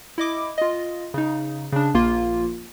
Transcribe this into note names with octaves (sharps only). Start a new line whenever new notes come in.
E4 D#5 D6
F4 D#5
C#3 D#4
C#3 D4
A#1 A#3 F4